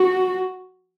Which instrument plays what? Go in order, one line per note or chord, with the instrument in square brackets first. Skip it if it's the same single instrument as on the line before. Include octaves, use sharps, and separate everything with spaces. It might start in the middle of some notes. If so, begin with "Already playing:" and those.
Already playing: [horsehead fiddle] F#4